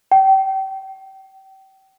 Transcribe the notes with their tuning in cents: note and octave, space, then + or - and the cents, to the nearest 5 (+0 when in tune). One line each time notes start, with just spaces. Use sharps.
G5 -30